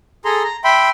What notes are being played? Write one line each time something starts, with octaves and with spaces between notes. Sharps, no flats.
G#4 A4 A#5 C6
A#5
E5 G5 B5 C6